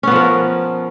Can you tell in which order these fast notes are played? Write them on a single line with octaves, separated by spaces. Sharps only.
C#4 B3 F3 A#4